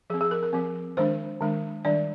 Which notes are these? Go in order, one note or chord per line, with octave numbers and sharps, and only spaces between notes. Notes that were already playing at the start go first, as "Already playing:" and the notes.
F3 C4 G#4
G#4
A#4
A#4
F3 C4
D#3 G#3 D4 C5
D#3 G#3 D4
D#3 G3 D4 D5